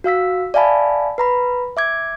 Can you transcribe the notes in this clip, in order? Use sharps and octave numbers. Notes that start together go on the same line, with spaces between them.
F#4 F5 E6 B6
D5 E5 F5 G#5 A5 B5
B4 A#5 B5
E5 D6 G#6